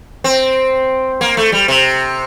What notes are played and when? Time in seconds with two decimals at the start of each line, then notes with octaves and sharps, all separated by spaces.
0.24 C4
1.21 A#3
1.37 A3
1.52 G3
1.68 C3